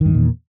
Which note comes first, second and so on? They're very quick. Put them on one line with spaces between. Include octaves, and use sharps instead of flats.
D#3 G2 E2 A#2